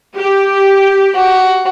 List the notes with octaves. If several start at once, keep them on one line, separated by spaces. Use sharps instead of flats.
G4
F#4